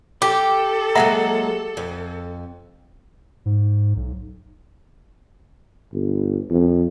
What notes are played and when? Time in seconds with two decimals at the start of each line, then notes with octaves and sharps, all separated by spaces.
0.22 G4 A4 D6
0.95 F#3 G#3 A#3 E5 F#5 A#5
1.77 F2
3.45 G#2
3.96 B1
5.93 G1
6.50 F2